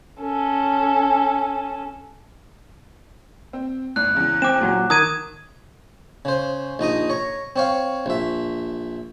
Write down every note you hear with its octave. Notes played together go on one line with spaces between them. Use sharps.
C#4 A4
C4
G#1 F#6
E2 C#3
C4 D6 E7
A#2 F#3
D#3 A#4 D#6 G#6 D#7
C#3 C5
A#1 D#4 A#5 D#6
C#5 A#5
C4 C#5 F5
A#1 E5